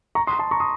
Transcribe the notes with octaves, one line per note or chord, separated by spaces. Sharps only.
A#5 C#6
C6 D#6
A5 C6
A#5 C#6
C6 D#6